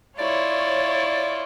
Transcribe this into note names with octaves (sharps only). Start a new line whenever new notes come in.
E4 F4 C#5 D5